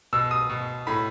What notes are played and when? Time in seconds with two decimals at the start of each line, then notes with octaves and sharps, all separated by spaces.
0.13 B2 E6
0.31 D#6
0.50 B2
0.87 A2 B5